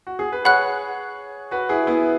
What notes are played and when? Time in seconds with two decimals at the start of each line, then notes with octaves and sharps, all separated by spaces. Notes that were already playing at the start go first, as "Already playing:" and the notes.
0.07 F#4
0.19 G#4
0.32 B4
0.45 G#4 C#5 F#5 B5 F#6
1.51 F#4 B4
1.69 E4 G#4
1.87 B3 E4